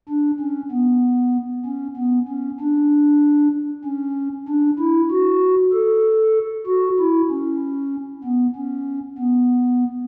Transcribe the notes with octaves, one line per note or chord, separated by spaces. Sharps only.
D4
C#4
B3
C#4
B3
C#4
D4
C#4
D4
E4
F#4
A4
F#4
E4
C#4
B3
C#4
B3